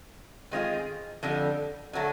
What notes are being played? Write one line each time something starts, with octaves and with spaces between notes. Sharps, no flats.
D#3 G#3 C4 F4 G#4
F2 D3 G3
D3 F#3 A3